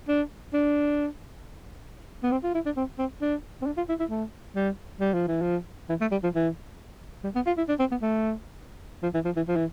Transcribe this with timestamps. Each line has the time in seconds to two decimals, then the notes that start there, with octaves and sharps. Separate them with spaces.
0.08 D4
0.53 D4
2.23 B3
2.32 C4
2.44 F4
2.54 E4
2.65 D4
2.77 C4
2.99 C4
3.21 D4
3.62 C4
3.66 D4
3.77 F4
3.89 E4
4.00 E4
4.10 A3
4.56 G3
5.00 G3
5.14 F3
5.28 E3
5.42 F3
5.89 E3
6.01 A3
6.11 G3
6.23 F3
6.35 E3
7.24 G3
7.35 B3
7.46 F4
7.57 E4
7.68 D4
7.79 C4
7.91 B3
8.02 A3
9.03 F3
9.14 E3
9.25 F3
9.36 E3
9.48 F3
9.56 E3